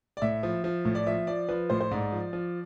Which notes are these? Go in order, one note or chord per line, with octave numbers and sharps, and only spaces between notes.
D5
A2 E5
F3
F3
A2
D5
F3 E5
F3 D5
F3 B4
A2 C5
C5
G#2 D5
F3
F3